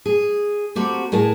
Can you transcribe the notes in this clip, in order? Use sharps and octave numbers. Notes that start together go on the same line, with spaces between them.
G#4
A#3 C4 F#4 G4 A4
A2 G#4 A#4 A5